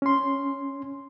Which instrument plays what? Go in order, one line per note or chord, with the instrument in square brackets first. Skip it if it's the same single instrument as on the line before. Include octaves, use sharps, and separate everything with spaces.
[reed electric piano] C#4 C6